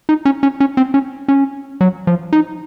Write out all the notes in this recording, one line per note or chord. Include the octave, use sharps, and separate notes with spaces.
D#4
C#4
C#4
C#4
C4
C#4
C#4
F#3
F3
D#4